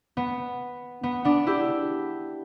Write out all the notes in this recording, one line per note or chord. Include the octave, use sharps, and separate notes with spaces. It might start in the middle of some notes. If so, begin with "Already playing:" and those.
B3
B3
B3 D4
E4 G4